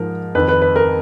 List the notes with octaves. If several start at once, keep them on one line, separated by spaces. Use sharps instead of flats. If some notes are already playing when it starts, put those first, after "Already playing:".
Already playing: G#2 F3 A#4
F2 D#3 B4
B4
B4
A#4